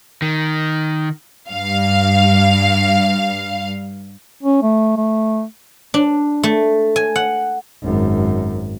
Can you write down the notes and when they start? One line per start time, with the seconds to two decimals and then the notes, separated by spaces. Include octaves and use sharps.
0.22 D#3
1.50 G2 F5
4.43 C#4
4.62 A3
4.97 A3
5.94 D4
6.43 A3
6.96 G#5
7.16 F#5
7.83 G#1 F#2